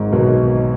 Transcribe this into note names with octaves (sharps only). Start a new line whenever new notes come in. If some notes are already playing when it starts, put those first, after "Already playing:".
Already playing: G#1 G#2
B1 B2